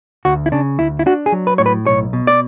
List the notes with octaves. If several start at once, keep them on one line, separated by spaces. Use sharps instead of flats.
D2 F#4
E4
C#3 D4
D2 E4
E4
D4 F#4
G#4
F#3
B4
A2 C#5
B4
B1 C#5
B2
D5